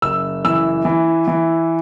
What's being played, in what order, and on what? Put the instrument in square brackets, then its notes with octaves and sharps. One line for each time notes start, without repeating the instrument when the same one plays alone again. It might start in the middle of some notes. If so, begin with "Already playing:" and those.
[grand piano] F#1 E6
E3 E6
E3
E3